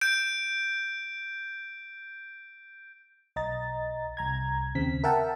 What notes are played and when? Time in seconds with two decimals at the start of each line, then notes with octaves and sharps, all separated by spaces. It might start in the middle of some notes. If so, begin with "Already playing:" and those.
0.01 G6 D7
3.36 B1 D#5 A#5 A6
4.17 C2 A#5 G#6
4.75 D#2 C#3 C4 B6
5.04 A#4 E5 F#5 G5 A5